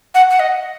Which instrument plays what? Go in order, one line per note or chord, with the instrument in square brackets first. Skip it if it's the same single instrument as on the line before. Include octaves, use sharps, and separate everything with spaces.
[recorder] F#5
F#5
D#5